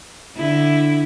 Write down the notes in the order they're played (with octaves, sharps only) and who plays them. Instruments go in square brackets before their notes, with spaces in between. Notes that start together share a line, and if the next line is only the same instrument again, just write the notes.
[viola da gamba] D3 E4